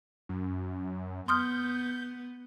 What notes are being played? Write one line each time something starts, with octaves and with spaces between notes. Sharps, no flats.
F#2
B3 C6 D#6 F6 G6